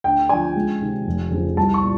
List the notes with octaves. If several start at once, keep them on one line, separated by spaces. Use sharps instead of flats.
D2 G5
D3 F3 G#5
C#2
C3 D#3
F1
F2 C#3 F3
C2 A5
C#6
A#2